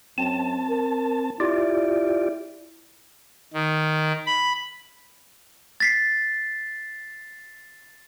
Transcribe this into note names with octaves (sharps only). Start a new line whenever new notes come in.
F#2 C4 A5
A#4
E4 F4 G4 D5
D#3
B5
A6 B6 C7